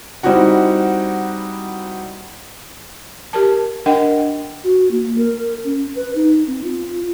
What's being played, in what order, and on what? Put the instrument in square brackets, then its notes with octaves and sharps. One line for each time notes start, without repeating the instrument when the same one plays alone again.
[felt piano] G3 C4 D#4 E4 F#4 F#5
[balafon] G4 A#4 A5
D4 A#4 D#5 F#5 G5
[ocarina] F#4
A#3
A#4
C#4
B4
D#4
C4
F4